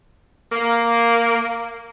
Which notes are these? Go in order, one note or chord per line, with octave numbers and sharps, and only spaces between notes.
A#3